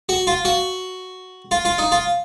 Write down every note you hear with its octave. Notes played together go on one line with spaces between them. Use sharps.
F#4
F4
F#4
F4
F4
D#4
F4